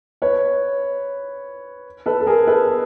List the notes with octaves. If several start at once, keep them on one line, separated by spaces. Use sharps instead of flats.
B4 C#5
A4 B4
A4
G#4 A#4
A4 B4